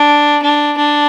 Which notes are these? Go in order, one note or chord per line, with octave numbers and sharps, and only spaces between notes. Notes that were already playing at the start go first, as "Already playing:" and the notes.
Already playing: D4
D4
D4